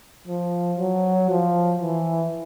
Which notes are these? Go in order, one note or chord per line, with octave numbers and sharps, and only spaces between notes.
F3
F#3
F3
E3